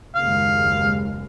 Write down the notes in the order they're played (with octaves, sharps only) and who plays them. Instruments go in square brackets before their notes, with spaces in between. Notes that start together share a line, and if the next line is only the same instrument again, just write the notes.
[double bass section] F#1 D#2 G#3 [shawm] F5